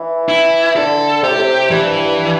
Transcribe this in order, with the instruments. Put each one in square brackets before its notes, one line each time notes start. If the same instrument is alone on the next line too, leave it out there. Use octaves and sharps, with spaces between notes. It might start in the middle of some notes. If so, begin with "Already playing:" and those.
Already playing: [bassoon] E3
[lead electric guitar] E4
[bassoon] D3 [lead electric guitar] A4
[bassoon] C3 [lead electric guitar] G4
[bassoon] A2
C3
[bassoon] G2 [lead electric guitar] E3